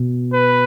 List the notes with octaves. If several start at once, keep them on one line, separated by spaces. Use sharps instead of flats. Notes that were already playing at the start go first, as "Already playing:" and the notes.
Already playing: B2
B4